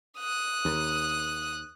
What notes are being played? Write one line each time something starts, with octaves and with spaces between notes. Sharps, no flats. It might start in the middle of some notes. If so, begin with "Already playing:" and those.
D#6 F#6
D#2